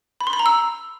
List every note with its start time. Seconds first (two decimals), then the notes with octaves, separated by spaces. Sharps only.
0.21 B5
0.27 C6
0.33 B5
0.39 A#5
0.46 E6